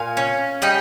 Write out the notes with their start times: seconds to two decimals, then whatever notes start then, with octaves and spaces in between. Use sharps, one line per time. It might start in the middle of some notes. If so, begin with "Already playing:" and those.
Already playing: A#2 F5 G#5
0.17 C#4
0.62 G3 D#5 G5